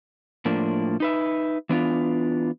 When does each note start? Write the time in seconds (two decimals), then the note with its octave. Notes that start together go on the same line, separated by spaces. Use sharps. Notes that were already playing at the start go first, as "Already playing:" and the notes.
0.45 A2 F3 A#3 D4
1.00 D#4 B4 E5
1.69 E3 B3 D4 F4